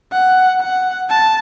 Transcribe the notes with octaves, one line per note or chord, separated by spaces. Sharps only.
F#5
F#5
A5